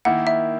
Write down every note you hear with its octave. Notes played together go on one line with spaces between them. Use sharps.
D#3 A#3 E4 F#5
E5